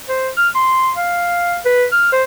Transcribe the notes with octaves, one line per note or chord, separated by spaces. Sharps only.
C5
F6
C6
F5
B4
F6
C5